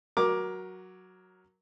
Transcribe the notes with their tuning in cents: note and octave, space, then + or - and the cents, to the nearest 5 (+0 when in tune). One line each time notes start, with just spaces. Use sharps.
F#3 +0 A#4 +15 D6 +0